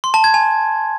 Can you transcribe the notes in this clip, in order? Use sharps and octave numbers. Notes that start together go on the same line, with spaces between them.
C6
A5
G#6
G#5